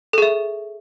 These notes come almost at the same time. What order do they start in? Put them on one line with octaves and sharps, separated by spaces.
A4 G#4 E5